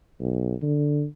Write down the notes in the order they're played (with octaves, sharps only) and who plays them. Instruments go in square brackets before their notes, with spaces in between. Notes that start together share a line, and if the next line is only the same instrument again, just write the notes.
[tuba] B1
D3